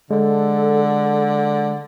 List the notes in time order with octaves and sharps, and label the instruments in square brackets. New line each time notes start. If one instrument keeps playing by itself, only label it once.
[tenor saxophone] D3 [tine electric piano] G#3 [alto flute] A4